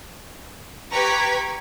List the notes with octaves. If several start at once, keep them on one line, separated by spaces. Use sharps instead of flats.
G4 B4 A#5 C#6 G#6 B6